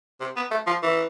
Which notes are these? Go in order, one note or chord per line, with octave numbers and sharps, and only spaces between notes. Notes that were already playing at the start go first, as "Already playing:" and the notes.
C3
B3
A3
F3
E3